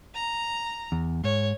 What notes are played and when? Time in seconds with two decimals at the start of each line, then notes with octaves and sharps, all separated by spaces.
0.15 A#5
0.92 E2
1.24 G#2 C#5